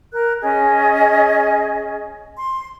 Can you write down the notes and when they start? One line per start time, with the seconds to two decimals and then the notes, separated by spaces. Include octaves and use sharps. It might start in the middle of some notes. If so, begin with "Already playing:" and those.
0.12 A#4 F#6
0.42 C#4 G#4 D#5 G#5
2.37 C6